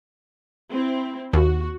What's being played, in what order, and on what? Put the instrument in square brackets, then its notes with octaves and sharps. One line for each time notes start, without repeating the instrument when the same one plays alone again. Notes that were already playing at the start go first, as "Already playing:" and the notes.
[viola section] C4 E4
[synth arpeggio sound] D#2 [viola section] F#4